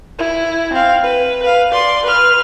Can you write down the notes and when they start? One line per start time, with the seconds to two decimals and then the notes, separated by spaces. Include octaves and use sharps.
0.19 E4
0.73 C4 F5
1.03 B4
1.43 B4 F5
1.72 D5 C6
2.03 B4 F6